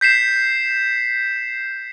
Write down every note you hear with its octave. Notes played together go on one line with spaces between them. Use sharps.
G6 B6 C7 E7